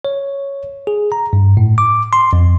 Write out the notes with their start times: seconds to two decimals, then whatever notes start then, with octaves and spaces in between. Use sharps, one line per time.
0.05 C#5
0.87 G#4
1.12 A#5
1.33 G2
1.57 A2
1.78 D6
2.13 C6
2.33 F2